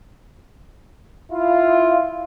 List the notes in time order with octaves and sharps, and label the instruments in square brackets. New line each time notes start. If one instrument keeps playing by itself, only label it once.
[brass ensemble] E4 F4